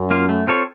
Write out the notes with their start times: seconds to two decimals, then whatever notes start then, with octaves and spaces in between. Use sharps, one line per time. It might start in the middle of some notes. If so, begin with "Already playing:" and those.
Already playing: F#2
0.11 A#3 F4
0.29 A3
0.47 C4 F4 A4 C#5